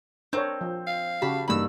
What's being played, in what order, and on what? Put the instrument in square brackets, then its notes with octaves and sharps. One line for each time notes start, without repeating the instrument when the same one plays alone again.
[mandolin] C4 [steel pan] D4 A#4 C#5 [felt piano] G6
[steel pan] F3
[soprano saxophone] F5
[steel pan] C#3 F#4 G4 [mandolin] A5 B5
[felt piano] G2 A#3 D#4 [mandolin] B5 E6